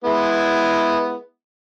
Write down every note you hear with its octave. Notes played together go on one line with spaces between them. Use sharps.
G#3 B3 E4